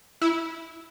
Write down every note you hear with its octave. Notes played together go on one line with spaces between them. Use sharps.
E4